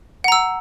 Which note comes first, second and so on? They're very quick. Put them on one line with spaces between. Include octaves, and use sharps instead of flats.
F#5 A#5 E6